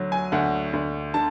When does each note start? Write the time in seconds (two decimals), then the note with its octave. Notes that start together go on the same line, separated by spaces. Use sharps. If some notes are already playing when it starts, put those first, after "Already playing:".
Already playing: D2 F#3
0.12 G#5
0.32 D2 F#5
0.73 D2
1.14 D3 A5